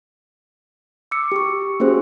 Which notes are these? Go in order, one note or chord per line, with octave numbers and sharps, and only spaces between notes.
D6 E6 C#7
G4 C#6
A#3 C#4 F#4 G#4 C5